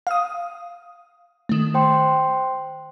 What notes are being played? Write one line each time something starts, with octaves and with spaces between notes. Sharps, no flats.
F5 D#6
D#3 A3
C5 G5 C6